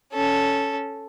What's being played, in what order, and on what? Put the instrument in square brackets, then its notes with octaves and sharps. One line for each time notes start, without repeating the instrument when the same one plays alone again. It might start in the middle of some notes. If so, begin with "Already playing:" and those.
[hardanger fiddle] C#4 A4